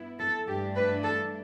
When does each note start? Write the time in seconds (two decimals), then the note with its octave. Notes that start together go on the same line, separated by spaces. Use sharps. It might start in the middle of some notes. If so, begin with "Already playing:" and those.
Already playing: G2 B3 E4
0.19 A4
0.47 G2 E3 A3 D4 G4
0.76 B4
1.04 A4